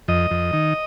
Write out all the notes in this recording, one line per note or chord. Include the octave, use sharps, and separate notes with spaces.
F2 D#5
F2
D#3